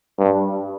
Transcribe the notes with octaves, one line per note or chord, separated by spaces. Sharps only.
G2